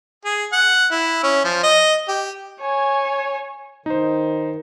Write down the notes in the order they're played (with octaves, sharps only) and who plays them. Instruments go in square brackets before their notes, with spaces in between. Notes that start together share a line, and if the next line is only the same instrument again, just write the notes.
[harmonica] G#4
F#5
E4
C#4
F3
D#5
G4
[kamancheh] C#5 G#5
[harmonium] D#3 [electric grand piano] D#4 C5